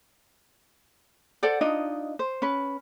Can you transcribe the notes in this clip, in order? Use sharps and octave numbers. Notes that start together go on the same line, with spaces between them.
A4 C5 D5 F#5
D4 D#4 F4 D#5
C5
C#4 B4